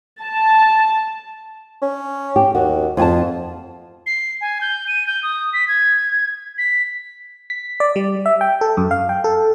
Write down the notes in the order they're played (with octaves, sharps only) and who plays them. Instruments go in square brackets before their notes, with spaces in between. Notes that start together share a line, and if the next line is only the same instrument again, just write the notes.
[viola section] A5
[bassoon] C#4
[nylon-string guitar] G4
[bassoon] D#2 [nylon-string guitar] F#4
[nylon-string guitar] F2 G#5 A5 [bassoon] F3
[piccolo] C7
G#5
G6
D#7
G6
D#6
B6
G#6
B6
[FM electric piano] B6
D5
G3
E5
G5
A4
F#2
F5
G5
A4